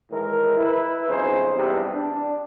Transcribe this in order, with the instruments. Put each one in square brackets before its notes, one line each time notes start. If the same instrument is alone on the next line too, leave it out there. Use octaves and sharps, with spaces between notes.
[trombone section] A2 D#3 E3 G#3 A#4
E4 B4
B1 F2 C#3 D#4 G#4 C5
E2 G2 C3 D4 G4 B4
D4